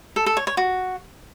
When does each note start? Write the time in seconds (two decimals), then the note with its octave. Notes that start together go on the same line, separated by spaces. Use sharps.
0.16 A4
0.26 A4
0.37 C#5
0.47 C#5
0.57 F#4